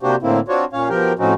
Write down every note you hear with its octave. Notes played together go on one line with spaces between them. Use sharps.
C3 A#3 D4 F#4 G4 C5
A2 D3 A#3 C4 E4
C4 D4 F4 F#4 C#5
A#2 C#4 C#5 F5
B2 F3 G4 A#4 G5
A2 F3 C4 C#4 D#4 F#4